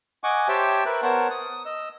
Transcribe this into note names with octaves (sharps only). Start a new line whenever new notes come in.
D#5 F#5 G#5 C#6 D6
G4 C5 C#5 E5 G5 A5
A#4 B4 E5 F#6
B3 A#4 C5 C#5 F#5 A5
D#6
D#5 E6